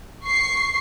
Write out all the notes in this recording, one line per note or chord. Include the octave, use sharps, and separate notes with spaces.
C#6 C7